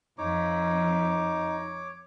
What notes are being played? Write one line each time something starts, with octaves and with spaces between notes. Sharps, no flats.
F2 D#4 C#5 D6